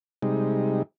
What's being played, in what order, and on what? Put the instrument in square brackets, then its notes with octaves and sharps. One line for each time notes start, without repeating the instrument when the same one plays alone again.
[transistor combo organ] C3 G3 G#3 D#4